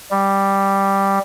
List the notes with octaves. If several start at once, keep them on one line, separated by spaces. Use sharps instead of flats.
G3